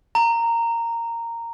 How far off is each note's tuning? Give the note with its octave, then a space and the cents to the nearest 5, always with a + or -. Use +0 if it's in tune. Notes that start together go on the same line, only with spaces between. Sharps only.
A#5 -10